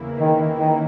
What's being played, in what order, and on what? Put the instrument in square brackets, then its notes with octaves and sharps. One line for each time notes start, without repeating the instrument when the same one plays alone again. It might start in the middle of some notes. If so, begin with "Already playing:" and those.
Already playing: [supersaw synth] E2 C#3 E3 A#3 E4
[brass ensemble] D#3
D#3